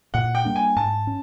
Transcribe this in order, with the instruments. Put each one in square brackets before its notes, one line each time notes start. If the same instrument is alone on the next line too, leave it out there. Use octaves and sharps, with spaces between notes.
[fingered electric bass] A#2 [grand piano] F#5
[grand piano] G5
[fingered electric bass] G3 A#3 D4
[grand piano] G#5
[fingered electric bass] G#2 [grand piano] A5
[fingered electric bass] C#4